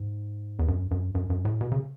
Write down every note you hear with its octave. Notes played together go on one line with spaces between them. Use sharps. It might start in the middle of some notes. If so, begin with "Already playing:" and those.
Already playing: G#2
E2
F#2
F#2
F#2
F#2
A2
B2
C#3